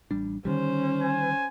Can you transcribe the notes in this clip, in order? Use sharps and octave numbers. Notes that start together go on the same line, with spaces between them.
A1 G3 D4
D3 D#3 G3 C#4 C5
G#5